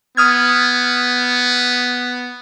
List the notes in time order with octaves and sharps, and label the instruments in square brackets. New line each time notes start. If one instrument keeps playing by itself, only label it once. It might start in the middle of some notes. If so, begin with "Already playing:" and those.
[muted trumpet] B3 [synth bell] D#6 F6 G#6